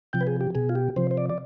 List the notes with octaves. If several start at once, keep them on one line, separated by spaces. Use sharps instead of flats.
C3 F3 G5
B4
G#4
G4
B2 G#4
F4
G4
C3 F3 C5
C5
D5
D5